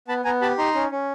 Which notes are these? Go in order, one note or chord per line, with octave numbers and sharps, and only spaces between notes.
B3 A5 B5
B3 G#5 A#5
G4 A5 B5
D#4 A#5 C6
C#4
C#4